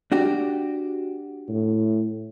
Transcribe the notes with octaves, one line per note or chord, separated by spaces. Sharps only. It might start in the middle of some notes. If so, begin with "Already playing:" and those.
D4 F#4 G4
A2